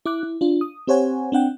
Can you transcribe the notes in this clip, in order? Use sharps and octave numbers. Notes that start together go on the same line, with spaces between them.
E4 D6 F#6
E4
D4 F4
D#6
C4 G4 C5 C#5 F#5 G#5
C4 D4 F#5 G5